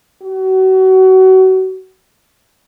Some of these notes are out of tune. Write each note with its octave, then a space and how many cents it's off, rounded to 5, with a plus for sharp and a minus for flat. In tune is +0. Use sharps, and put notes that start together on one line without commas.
F#4 +30